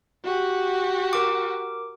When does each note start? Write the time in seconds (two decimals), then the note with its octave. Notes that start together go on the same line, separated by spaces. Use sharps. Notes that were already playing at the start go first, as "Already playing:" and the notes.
0.24 F#4 G4
1.13 A#4 D6